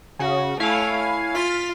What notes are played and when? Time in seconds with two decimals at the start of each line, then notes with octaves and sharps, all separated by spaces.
0.19 C#3 F#4
0.60 A3 E4 C#5 F5 G#5
0.98 G#5
1.35 F4 F6 A6 B6